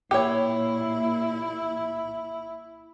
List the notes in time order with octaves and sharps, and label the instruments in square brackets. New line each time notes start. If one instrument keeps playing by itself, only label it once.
[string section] A#2 [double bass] E4 [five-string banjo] G4 C#5